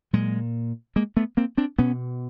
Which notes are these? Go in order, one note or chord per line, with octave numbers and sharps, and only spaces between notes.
A#2 F#3 G#3
G#3 A#3
A3 B3
A#3 C4
C4 D4
B2 B3 C#4